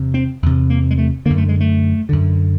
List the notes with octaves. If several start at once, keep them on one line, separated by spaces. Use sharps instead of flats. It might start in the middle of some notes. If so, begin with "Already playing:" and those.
Already playing: E2 C3
C4
E2 C3
A#3
G#3
A3
F#2 D3 A#3
A3
G#3
A3
F#2 D3